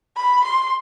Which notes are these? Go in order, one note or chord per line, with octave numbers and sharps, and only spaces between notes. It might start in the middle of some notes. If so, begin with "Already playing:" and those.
B5
C6